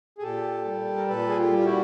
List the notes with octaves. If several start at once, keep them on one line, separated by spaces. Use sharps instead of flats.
G#4
A#2 G4 A4
G3
A#4
A#2 A4 B4
G#4
F4 G4
G3
F4
E4 F#4